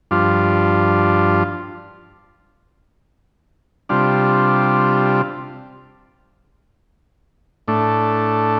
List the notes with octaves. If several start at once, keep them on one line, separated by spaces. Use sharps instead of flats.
G2 F3 D4 F4
C3 G3 D4 F4
A2 A3 D4